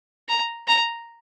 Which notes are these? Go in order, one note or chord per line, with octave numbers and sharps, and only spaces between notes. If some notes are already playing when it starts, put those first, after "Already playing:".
A#5
A#5